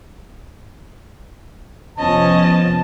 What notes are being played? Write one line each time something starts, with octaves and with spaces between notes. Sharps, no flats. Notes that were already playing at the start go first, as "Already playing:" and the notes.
F1 F3 B3 C#4 D#5 A5